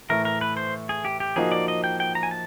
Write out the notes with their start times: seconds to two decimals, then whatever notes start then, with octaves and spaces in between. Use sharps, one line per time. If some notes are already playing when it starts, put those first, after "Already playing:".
0.09 A2 E3 A3 A#4
0.25 A#4
0.41 B4
0.57 C5
0.89 G#4
1.05 G4
1.20 G4
1.36 F3 A#3 D#4 F#4 G#4
1.52 D5
1.68 D#5
1.84 G5
2.00 G5
2.15 A#5
2.23 G#5
2.31 A5